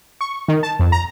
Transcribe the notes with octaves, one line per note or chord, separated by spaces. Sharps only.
C#6
D#3
A5
F2
A#5